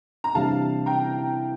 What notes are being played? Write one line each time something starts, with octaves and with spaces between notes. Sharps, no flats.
A#5
C3 E3 G3 D4 F5 A5
G5 A#5